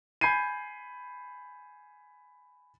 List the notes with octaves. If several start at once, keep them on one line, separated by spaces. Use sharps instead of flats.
G#5 B5 G6 G#6 C7 D#7